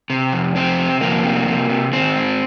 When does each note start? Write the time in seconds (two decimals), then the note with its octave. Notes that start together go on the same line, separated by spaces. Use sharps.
0.10 C3
0.33 F2
0.56 C3 C4
0.78 C3
1.01 F2 A#3
1.24 C3
1.47 C3
1.69 C3
1.93 D#3 C4
2.15 G#2